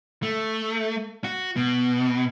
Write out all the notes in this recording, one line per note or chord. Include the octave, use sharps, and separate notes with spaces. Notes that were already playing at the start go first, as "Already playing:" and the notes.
A3
F#4
B2